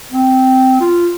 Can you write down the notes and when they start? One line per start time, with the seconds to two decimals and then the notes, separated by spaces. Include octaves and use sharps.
0.11 C4
0.81 F4